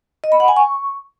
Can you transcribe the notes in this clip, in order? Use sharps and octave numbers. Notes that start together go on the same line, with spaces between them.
D#5
B5
F#5
G#5
C#6